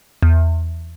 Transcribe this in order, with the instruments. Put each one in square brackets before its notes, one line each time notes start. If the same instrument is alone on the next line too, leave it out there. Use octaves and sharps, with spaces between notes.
[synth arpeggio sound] E2